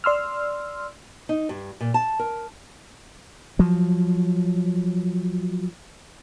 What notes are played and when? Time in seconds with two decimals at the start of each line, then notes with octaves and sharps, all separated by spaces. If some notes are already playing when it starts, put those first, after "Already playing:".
0.04 D5 C6 E6 F6
1.29 D#4
1.49 G2
1.81 A#2
1.94 A5
2.19 A#4
3.59 F3 F#3